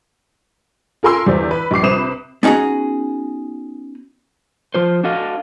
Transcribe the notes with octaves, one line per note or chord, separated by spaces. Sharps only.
F4 A4 A#4 G#5 C6 E6
E2 D3 G4 C5 D5
B4
A#1 G3 D6 C7
C3 B4 C5 D#6 E7
B3 C#4 D#4 F#4 G#4
F3 F4 C5
D4 F#4 A4 D#5 F5